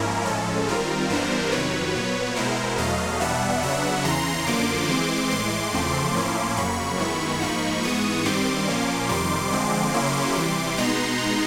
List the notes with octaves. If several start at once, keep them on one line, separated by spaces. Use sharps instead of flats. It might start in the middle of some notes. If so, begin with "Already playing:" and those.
Already playing: G#2 F3 A#3 C#4 E4 A#4
A2 F3 G#3 C#4 A4
D#3 G3 C4 F4 A#4
G2 E3 G3 B3 D4 A#4 C5
F2 C3 D#3 F#3 B4 C#5
A#2 F#3 B3
B2 G#3 B3 E4 A#4 C5
E2 B2 F#3 A3 D#5 F5
E2 B2 G3 B3 D4 E5 F#5
C#3 F#3 B3 D4 E5 F#5
E2 C#3 E3 A#5 C6
F#2 D3 F3 A#3 C6 D6
E3 G#3 C4
A2 E3 G#3 C6 D6
E2 C#3 F3 A3 C4
A2 F3 A#3 C#4 E4 C6 D6
F2 C#3 F#3 A#3 B5 C#6
F#2 D#3 G#3 B3 E4
G#2 F3 A#3 D#4 B5 C#6
G#2 E3 G#3 B3 C#6 D#6
G2 D#3 G3 C4 C6 D6
A#2 F3 A#3 C#4
F2 C3 D#3 G3 C6 D6
D3 F3 G#3 C4
C#3 F#3 A#3 C#4 E4
C3 E3 G3 C6 D6
B2 G#3 B3 D#4 A#5 C6